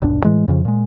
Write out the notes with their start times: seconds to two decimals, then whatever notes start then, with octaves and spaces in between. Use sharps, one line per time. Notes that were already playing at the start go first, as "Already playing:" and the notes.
0.02 D#1 B1 G2 D4
0.24 A2 E3 G#3
0.48 F2 C#3 F3
0.65 A#2 G#3